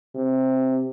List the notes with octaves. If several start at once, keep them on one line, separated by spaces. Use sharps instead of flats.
C3